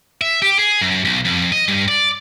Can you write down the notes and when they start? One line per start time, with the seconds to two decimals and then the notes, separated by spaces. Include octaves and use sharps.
0.21 E5
0.42 G4
0.59 G#4
0.81 F#2
1.05 B1
1.25 F2
1.52 D#5
1.68 G2
1.88 D5